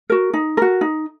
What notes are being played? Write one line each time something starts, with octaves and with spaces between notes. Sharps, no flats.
F#4 A#4
D#4
F#4 A#4
D#4